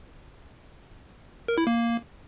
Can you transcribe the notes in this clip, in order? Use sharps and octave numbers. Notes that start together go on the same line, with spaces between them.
A#4
E4
A#3